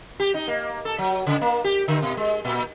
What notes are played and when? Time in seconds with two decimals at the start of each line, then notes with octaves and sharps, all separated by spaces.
0.20 G4
0.34 D#4
0.48 A#3
0.85 A4
0.98 F#3
1.27 C#3
1.41 A#3
1.64 G4
1.88 D3
2.02 B2
2.17 G#3
2.45 A#2